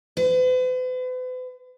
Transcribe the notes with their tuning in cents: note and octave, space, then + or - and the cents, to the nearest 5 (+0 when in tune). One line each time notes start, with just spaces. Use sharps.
B4 +45